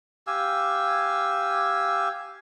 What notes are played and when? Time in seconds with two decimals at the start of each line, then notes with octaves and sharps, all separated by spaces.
0.27 G4 F5 G#5 E6